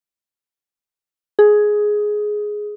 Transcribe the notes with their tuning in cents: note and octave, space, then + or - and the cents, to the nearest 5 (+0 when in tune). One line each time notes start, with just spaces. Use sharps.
G#4 +10